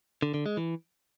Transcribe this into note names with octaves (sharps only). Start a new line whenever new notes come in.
D3
D3
G#3
E3